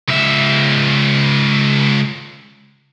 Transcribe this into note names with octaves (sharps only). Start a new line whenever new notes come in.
C#2 E5